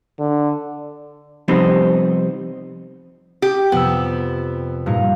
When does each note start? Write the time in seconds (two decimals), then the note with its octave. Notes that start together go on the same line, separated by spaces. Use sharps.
0.19 D3
1.48 C3 F3 G3 B3 C4 D#4
3.42 G4
3.72 F2 C3 B3 E6
4.86 G2 A#2 D#4